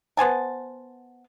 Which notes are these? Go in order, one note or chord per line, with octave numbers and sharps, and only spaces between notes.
B3 C5 G#5 A5